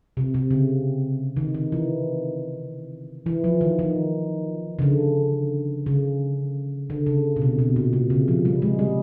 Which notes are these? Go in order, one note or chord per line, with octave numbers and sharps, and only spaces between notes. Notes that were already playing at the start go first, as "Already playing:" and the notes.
C3
C3
C#3
D#3
D#3
E3
E3
F3
D#3
D#3
C#3
D3
C#3
D3
C#3
B2
C3
B2
A#2
C3
C#3
F3
G3
G#3
G3